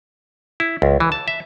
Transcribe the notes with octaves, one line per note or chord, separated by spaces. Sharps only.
E4
C#2
E3
A5
E5